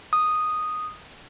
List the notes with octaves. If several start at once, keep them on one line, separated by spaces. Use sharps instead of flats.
D#6